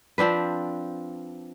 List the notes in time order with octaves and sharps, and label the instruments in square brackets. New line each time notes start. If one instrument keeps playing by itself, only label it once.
[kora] F3 C4 D4 B4